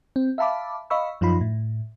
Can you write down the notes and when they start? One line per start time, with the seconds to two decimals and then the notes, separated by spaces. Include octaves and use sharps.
0.16 C4
0.38 E5 F5 A5 B5 D6
0.90 D#5 F5 B5 C#6 E6
1.21 F#2 F3 D#4 F4 B5
1.41 A2